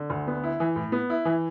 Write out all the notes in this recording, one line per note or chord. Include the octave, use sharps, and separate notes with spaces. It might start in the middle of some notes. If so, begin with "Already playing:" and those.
Already playing: D3
D2
B3
E4
E3
A2
B3
E4
E3